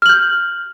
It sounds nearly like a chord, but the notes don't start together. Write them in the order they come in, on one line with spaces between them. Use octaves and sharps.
F6 F#7 G6